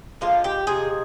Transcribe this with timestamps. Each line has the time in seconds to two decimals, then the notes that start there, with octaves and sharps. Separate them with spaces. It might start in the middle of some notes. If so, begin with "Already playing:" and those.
0.21 D3 F3 G#3 F4
0.44 G4
0.67 C3 F3 G#3 G#4